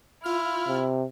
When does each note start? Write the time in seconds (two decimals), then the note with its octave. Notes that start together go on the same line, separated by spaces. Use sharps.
0.24 E4 F4 F6
0.68 C3